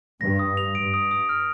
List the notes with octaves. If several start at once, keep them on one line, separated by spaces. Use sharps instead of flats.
G2 A#6
D#6
F7
G2 D7
D#6
D#6
F6